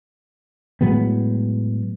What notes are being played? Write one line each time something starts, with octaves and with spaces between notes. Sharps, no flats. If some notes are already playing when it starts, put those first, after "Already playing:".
A2 F#3 G#3 B3